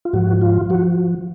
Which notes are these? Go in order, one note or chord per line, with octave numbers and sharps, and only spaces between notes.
F4
G#2 F3 F#4
F4
F3 F#4